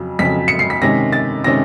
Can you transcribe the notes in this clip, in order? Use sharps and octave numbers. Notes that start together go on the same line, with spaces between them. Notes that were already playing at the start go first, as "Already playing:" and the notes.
Already playing: F2 C#3 F#3
F2 C#3 F#3 B6
C#7
C7
B6
C3 D#3 G#3 C#4 A#6
A6
C3 D#3 G#3 C#4 A#6